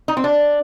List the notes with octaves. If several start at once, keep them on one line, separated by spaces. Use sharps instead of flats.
D#4
C4
D4